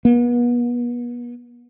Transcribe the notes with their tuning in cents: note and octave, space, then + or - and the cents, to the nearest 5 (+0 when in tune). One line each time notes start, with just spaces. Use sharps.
B3 -35